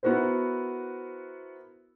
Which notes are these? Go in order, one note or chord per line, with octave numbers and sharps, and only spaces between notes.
B3 E4 F#4 A#4 C5